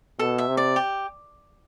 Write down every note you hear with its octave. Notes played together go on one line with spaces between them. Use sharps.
B2 A4
E5
C3
D5
G4